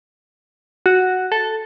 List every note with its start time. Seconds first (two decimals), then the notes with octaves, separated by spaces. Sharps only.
0.86 F#4
1.32 A4